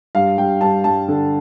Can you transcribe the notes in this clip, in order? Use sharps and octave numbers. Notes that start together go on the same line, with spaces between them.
G2 F5
G2 G5
G2 A5
G2 A5
D3